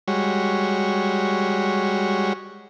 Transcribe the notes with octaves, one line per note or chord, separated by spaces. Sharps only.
G3 G#3 F#4 C#5